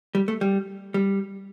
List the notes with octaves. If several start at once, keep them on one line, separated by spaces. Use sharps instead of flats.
G3
A3
G3
G3